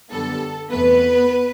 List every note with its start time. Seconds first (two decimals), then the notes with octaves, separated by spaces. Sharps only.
0.11 F#2 D3 G3 B3 A4
0.71 E2 C3 E3 A3 B3 B4